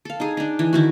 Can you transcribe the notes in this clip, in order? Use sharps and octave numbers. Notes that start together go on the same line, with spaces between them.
A4 F5
D#4 G#4
D4 D#4
E3
D#3 E4 F#4